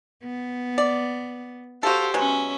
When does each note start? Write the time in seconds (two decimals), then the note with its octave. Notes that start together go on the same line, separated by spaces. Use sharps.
0.23 B3
0.78 D5
1.83 F#4 G4 A4 C5 F5
2.14 B2 F#3 G#3 C#4 E5